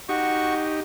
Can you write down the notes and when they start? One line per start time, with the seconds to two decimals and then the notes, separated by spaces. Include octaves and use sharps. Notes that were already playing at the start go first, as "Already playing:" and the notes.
0.09 D#4 F#4 G4 C#6